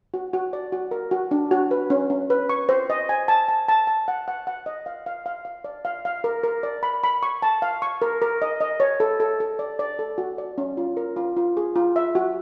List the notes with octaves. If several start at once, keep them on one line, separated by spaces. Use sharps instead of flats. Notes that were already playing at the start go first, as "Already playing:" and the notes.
F#4
F#4
D5
F#4
A#4
F#4
D4
F#4
B4
C#4
C#4
B4
C#6
C5
D#5
G#5
A5
A5
A5
A5
F#5
F#5
F#5
D#5
F5
F5
F5
F5
D5
F5
F5
A#4
A#4
D5
B5
B5
C#6
A5
F5
C#6
A#4
A#4
D#5
D#5
C#5
A4
A4
A4
D5
D5
A4
F#4
D5
C#4
F4
A#4
F4
F4
G#4
F4
E5
F#4